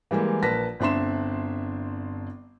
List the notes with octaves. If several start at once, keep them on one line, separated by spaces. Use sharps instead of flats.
E3 G3 G#3 A#3
A#1 A#4 B4 A5 A#6 B6
G1 C4 D4 E5 C6 E7